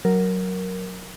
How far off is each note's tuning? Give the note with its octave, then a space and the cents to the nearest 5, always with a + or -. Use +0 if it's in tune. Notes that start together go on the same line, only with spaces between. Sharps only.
F#3 +0 A#4 +0